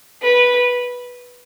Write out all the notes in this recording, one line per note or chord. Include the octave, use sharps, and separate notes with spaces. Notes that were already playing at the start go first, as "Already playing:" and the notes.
B4